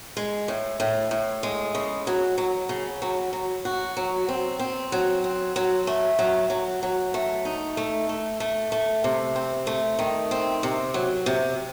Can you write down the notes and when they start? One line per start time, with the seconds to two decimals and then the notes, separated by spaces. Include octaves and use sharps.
0.17 G#3
0.48 A2
0.80 A2
1.11 A2
1.43 G#3
1.75 C#3
2.07 F#3
2.38 F#3
2.69 C#3
3.02 F#3
3.33 F#3
3.65 F#4
3.97 F#3
4.28 C4
4.59 C4
4.92 F#3
5.24 C4
5.56 F#3
5.87 A3
6.19 F#3
6.50 F#3
6.83 F#3
7.14 A3
7.45 D#4
7.77 A3
8.09 A3
8.40 A3
8.72 A3
9.04 C3
9.36 C4
9.67 A3
9.99 D#3
10.31 C4
10.63 C3
10.94 F#3
11.26 C3